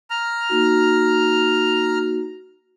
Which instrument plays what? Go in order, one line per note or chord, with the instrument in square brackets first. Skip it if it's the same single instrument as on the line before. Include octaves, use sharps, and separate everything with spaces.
[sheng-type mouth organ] A#5 F6
[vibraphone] A#3 D#4 F#4